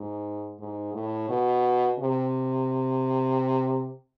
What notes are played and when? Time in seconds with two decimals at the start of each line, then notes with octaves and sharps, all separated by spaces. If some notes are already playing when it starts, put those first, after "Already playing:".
Already playing: G#2
0.59 G#2
0.94 A2
1.29 B2
1.99 C3